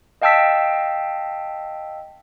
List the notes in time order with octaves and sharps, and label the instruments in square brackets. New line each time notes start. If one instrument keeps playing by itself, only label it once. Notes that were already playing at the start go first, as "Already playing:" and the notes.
[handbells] D#5 F5 G5 A5 E6 B6